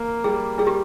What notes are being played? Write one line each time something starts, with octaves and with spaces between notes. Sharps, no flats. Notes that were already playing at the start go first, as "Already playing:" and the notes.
Already playing: A#3
G3 G#4
G3 G#4
G4